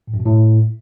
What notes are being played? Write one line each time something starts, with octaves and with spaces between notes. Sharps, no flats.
A2
F#2
B2
A2